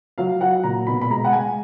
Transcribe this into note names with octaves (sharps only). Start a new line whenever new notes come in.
F#3 F5
F#3 F#5
A#2 A#5
B2 B5
B5
G#3 A#5
F#5
G#3 G#5